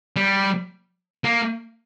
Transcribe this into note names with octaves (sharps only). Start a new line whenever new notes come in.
G3
A#3